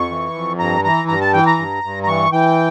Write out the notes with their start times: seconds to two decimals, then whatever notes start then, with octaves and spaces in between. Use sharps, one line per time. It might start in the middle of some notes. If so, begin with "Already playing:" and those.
Already playing: F2 C#6
0.10 E3
0.34 F2
0.59 G2 A#5
0.84 E3 A#5
1.08 G2 A#5
1.21 A5
1.33 E3 G5
1.46 A#5
1.58 G2
1.83 G2
2.03 A#5
2.07 E3 C#6
2.32 E3 G5